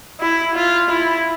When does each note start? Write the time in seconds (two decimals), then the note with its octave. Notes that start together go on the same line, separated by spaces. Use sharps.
0.20 E4
0.55 F4
0.90 E4